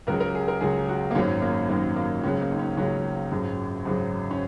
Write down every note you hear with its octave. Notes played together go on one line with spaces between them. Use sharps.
C#2 C#3 F#3 A#4
A#4
G#4
A#4
C#2 C#3 F#3 G#4
F#4
A#3
G#1 F#2 D#3 F#3 C#4
A#3
G#1 F#2 D#3 F#3 A#3
A#3
C#2 C#3 F#3 C#4
A#3
D#4
C#4
C#2 C#3 F#3 C#4
G#1 F#2 C#3 F#3
G#1 F#2 C#3 F#3
C#4